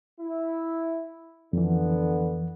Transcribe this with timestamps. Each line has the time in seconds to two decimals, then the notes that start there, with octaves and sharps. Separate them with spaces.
0.20 E4
1.53 F2 D3 E3 B3